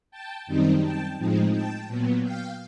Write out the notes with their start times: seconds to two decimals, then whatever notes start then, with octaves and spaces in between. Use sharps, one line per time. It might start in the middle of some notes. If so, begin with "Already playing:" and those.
0.11 G5 A5
0.47 F#2 D#3 G3 C4 D#4
0.82 G5 A5
1.18 A2 F3 G#3 C4 D#4
1.53 G5 A5
1.88 A#2 F#3 B3
2.24 F5 G5